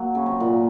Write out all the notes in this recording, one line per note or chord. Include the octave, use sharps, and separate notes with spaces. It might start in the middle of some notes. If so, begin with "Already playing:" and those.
Already playing: F#3 A#3
C#3
C3
A#2